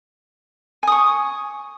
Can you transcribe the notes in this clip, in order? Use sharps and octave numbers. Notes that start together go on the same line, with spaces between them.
G#5 C#6 D#6